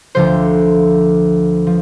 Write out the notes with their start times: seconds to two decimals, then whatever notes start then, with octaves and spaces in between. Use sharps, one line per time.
0.15 D2 D3 F3 C5
1.67 F3